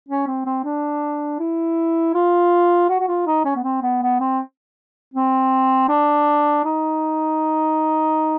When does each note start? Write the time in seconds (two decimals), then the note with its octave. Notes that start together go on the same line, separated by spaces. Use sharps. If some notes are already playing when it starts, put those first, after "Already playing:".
0.08 C#4
0.27 C4
0.46 C4
0.64 D4
1.39 E4
2.14 F4
2.89 F#4
3.00 F#4
3.08 F4
3.26 D#4
3.45 C#4
3.56 B3
3.63 C4
3.82 B3
4.02 B3
4.20 C4
5.14 C4
5.89 D4
6.64 D#4